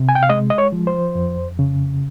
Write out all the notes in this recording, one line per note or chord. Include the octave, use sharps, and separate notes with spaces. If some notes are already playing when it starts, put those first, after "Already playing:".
Already playing: C3
G#5
G5
F5
G#3 D#5
D#5
C#5
F3
C5
F2
C#3